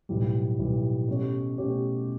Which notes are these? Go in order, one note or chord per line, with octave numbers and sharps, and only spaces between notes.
B1 A2 E3 G3
B1 A2 E3 G3
B2 A3 C#4 G4 C#5
B2 A3 C#4 G4 C#5